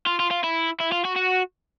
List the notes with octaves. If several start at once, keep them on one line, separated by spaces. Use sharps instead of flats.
F4
F4
F4
E4
E4
F4
F#4
F#4